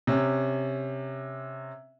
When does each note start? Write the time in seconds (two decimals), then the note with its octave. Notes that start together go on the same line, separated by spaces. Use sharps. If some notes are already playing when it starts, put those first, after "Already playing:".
0.07 C3 C#4